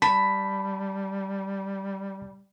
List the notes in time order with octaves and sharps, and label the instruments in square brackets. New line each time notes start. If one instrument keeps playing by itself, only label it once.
[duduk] G3 [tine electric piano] A5 [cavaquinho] B5